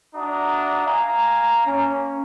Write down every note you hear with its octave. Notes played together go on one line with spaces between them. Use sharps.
D4 F#4 E5 A#5 D#6
F5 G#5 A#5
A#3 C#4